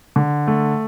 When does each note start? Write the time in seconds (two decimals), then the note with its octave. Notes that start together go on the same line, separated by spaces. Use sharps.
0.16 D3
0.47 A3